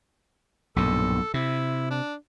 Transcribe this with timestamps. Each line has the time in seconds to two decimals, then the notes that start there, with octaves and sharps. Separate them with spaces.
0.76 B1 G2 A#2 A4
1.34 C3 E4
1.90 D4